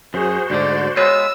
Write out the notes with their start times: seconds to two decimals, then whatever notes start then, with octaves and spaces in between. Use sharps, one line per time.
0.14 F#2 F#4 G#4 C5
0.50 D2 G#2 D3 D5
0.97 G#3 B3 F4 C#5 E6